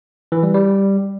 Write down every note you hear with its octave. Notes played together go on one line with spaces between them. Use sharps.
E3
G3
G3